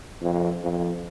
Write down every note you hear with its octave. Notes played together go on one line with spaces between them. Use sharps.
F2
F2